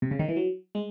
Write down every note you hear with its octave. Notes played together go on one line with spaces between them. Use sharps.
C3
C#3
D#3
E3
F#3
G#3